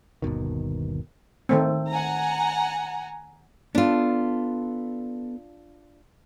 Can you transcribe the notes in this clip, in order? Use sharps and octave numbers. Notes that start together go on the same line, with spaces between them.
G1 D#2 B2 D#3
D#3 A3 C4
F#5 G#5 A#5
B3 D4 F4 A4